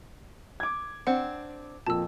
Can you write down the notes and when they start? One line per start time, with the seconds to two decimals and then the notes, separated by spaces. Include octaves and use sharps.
0.60 D6 G#6
1.07 C4 D4 F#5
1.87 F2 A#2 A5 E6